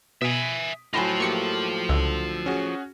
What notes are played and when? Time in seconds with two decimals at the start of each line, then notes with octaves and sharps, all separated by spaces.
0.22 B2 E5 G#5 D#6 B6 D7
0.94 A2 F#3 F4 C5 G#5 B5 A#6
1.20 A#3 G4 C#6 C#7
1.89 C#2 D3 E6
2.46 C#4 F#4 G#4